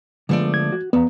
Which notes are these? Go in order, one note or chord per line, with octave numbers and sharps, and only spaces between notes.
D3 F3 G#3 A3 B3 D5
G#6
F#4
E2 B3 D5 F5 A#5